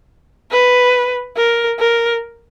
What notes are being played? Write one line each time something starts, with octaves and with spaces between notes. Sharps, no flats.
B4
A#4
A#4